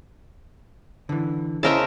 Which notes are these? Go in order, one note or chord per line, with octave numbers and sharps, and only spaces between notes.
D3 E3
C#3 E4 A#4 C5 D#5 E5 A5